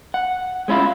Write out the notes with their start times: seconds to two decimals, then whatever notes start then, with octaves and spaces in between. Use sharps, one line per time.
0.14 F#5
0.68 G#3 C#4 E4 F4